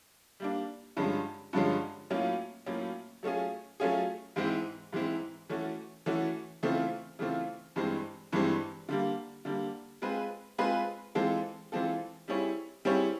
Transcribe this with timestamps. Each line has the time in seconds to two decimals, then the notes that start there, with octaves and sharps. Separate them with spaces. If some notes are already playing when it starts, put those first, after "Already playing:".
0.40 G3 A#3 D4
0.97 G2 D3 F3 G#3 C#4
1.53 G2 D3 F3 G#3 C#4
2.10 A2 F#3 A#3 C#4 F4
2.66 A2 F#3 A#3 C#4 F4
3.23 F#3 A3 C#4 F4 G#4
3.80 F#3 A3 C#4 F4 G#4
4.36 G#2 E3 G#3 C4 E4
4.93 G#2 E3 G#3 C4 E4
5.49 E3 A3 C#4 F#4
6.06 E3 A3 C#4 F#4
6.63 C#3 E3 A3 C4 F4
7.19 C#3 E3 A3 C4 F4
7.76 G2 E3 G#3 C4
8.32 G2 E3 G#3 C4
8.89 D3 G3 A#3
9.45 D3 G3 A#3
10.02 G#3 C4 F4 G#4 B4
10.58 G#3 C4 F4 G#4 B4
11.15 E3 G#3 C4 F4 A4
11.72 E3 G#3 C4 F4 A4
12.28 G3 C4 E4 G#4 C#5
12.85 G3 C4 E4 G#4 C#5